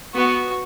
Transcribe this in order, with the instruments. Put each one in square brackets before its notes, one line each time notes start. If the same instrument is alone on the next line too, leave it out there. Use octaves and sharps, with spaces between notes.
[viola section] B3 [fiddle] F#4